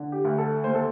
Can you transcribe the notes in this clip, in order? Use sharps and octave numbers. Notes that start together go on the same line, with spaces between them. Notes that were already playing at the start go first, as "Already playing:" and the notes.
Already playing: D3
G4
D2
A4
D#2 C5
A4